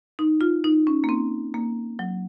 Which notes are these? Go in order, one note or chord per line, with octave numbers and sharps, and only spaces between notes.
D#4
F4
D#4
C#4
A#3
C4
A#3
F#3